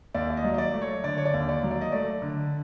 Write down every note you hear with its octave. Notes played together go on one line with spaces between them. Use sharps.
D#2 D5
D5
D#5
F#3
D#5
D5
A3
C#5
D3 D5
C#5
D5
D#2
D5
F#3
D5
D#5
A3 D5
D3